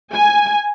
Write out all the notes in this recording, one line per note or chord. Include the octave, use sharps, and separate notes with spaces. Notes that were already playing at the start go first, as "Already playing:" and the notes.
G#5